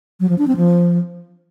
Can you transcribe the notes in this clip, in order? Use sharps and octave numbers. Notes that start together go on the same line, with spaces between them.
F#3
F3
D4
C4
F3